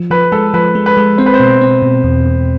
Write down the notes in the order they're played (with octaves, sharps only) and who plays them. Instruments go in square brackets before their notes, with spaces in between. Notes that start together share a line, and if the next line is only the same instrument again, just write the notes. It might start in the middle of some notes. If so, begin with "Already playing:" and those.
Already playing: [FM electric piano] F3
[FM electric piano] F3 [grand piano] B4
[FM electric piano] G#3 [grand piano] A4
[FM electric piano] F3 [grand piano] B4
[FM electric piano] G#3
[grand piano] B4
[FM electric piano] G#3
[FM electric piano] C4 [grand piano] C5
[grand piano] B4
C5
[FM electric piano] B2
C4
B2
E2
E2